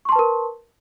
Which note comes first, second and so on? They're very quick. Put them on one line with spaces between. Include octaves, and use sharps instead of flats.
C#6 C6 A5 B4 A#4